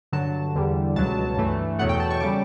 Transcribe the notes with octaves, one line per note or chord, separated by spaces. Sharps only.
G2 D3 F#3 A5
E2 D3 G3
C#2 B2 F#3 A5
G2 E3 A3
E2 B2 F#3 A3 F#5
G5
A5
C#6
C#3 G3 D6